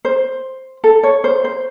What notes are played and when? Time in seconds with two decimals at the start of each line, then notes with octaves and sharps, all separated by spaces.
0.05 C5
0.84 A4
1.03 C#5
1.24 C5
1.44 C5